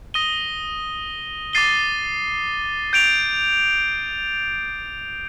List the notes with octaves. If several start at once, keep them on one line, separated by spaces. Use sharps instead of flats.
D#6 A#6 D#7 G7
D6 A6 C7 D#7 G7
G6 D7 F7